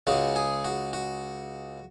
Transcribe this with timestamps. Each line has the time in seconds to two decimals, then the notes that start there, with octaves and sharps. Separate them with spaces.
0.07 C#2 C#3 G#3 F#4
0.36 G#4
0.65 F#4
0.93 F#4